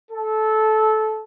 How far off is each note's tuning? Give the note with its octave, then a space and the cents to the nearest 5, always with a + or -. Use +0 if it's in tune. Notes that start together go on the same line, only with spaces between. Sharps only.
A4 -20